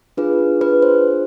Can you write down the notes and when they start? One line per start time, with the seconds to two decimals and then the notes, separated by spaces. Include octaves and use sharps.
0.17 D4 F4 G#4 B4
0.61 B4
0.82 C5